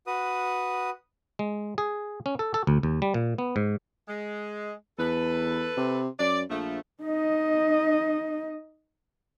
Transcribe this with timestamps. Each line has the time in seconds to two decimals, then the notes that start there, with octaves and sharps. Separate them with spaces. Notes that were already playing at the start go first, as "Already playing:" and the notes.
0.07 F#4 B4 D#6
1.39 G#3
1.78 G#4
2.26 C#4
2.39 A4
2.54 A4
2.67 D2
2.83 D#2
3.02 G3
3.14 A#2
3.38 B3
3.56 G#2
4.08 G#3
4.98 E2 A4 B4
5.77 C3
6.19 F#2 D5
6.50 A#1 F3 A3
7.02 D#4 D#5